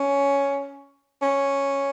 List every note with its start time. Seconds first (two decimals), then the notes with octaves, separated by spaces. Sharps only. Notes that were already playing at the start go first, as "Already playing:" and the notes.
Already playing: C#4
1.22 C#4